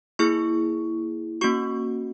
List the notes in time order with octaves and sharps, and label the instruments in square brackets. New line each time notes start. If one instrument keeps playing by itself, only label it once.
[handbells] A#3 E4 G#4 C#6
A#3 C#4 F#4 C#6